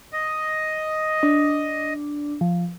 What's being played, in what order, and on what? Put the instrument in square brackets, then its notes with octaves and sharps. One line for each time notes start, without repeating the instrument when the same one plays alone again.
[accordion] D#5
[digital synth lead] D4
F3